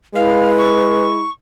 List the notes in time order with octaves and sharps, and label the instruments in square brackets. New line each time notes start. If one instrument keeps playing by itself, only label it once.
[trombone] G#3 [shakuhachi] E4 [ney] B4 [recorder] F5
[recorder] C#6